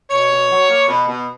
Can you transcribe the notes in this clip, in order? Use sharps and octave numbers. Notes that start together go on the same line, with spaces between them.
B2 C#5
B2
F#3
A#3
B2
B2